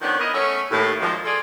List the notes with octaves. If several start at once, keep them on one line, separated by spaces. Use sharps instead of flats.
D#3 F3 B3 C#4 D4
B3 E4 A#4 D#5
A3 B3 C#4
D#2 A2
F#2 A#2 D#3 F3 G#3
F4 G#4 A4 D5